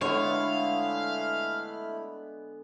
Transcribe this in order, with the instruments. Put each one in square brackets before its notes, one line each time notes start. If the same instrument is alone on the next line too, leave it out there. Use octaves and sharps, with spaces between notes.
[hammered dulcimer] D3 G#3 B3 [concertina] A3 E4 B5 [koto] C#5 [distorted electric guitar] F5